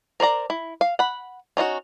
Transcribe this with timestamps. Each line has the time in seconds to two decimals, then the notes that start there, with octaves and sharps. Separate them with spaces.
0.20 A#4 C5 D5 A#5
0.50 E4
0.81 F5
0.99 F#5 B5
1.57 C#4 D#4 F4 F#4